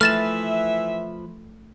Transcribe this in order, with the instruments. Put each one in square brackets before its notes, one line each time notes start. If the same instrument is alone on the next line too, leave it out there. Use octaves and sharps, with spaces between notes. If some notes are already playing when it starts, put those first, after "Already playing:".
[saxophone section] E3 E5 [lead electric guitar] F3 B4 [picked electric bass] A3 [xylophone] F6 A6 E7